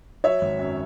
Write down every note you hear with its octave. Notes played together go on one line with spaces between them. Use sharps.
F#3 C#5 E5
G#1
F#2